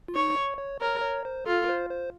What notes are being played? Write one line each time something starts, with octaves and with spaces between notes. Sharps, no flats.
F4
D#4 C#5
C#5
C#5
A#4 C#5
C#5
C5
F4 A4
A#4
C5
C5